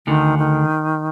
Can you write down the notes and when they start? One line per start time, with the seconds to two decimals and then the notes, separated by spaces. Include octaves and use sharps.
0.07 D2 D3 D#3
0.39 D#3